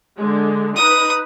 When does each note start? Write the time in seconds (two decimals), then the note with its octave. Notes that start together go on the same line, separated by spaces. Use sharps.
0.17 D3 G#3
0.76 D#4 B4 D#6